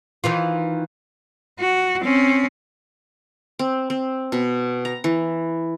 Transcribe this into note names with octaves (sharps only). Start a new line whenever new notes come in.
D#3 E3 F4
F#4
C4 C#4
C4
C4
B2
A#5
E3